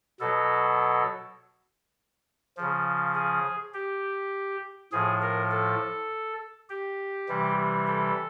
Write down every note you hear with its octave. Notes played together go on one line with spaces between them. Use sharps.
B2 F#3 A4
C#3 F3
G#4
G4
A2 F3 G#4
A#4
A4
G4
C3 E3 G3
A4